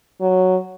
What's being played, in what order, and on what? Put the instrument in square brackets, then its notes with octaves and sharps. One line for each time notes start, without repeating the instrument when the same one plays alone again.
[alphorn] F#3